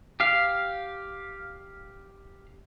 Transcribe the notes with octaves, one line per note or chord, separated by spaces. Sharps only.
G4 F5